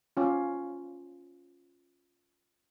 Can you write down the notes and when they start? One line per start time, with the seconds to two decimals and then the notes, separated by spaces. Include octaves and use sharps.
0.17 C#4 F4